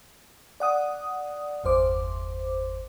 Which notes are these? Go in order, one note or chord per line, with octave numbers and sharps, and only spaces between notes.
D5 F#5 D#6
G1 E2 C5 D6